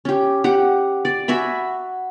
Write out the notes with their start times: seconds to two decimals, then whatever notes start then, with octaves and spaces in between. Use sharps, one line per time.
0.05 C#4 G4
0.44 G4 F#5
1.05 D5
1.28 F#4 E5 G#5 B5